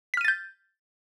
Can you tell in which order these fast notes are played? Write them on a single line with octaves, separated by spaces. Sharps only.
B6 F6 D#7 A6 G6